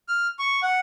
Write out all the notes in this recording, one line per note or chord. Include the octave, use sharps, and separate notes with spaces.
F6
C#6
F#5